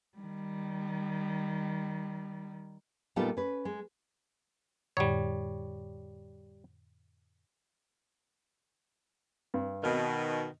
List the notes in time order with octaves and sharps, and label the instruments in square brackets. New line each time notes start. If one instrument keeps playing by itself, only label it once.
[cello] D#3 G3
[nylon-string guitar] A#2 G3 B3 D#4 F4 A4
C#4 B4
G#3
[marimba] F2 A2 D3 [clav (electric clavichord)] G3 C#5
[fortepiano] G2
[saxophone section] B2 D#3 [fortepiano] D#5 F6